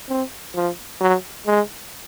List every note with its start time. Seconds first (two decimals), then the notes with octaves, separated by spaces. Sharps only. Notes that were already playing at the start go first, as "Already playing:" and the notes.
0.09 C4
0.55 F3
1.01 F#3
1.47 G#3